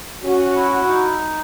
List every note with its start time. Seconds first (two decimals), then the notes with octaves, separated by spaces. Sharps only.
0.23 C#4 F#4
0.55 E4
0.87 D#4